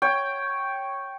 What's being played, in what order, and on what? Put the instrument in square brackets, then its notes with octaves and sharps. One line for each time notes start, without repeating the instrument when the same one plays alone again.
[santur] C#5 G5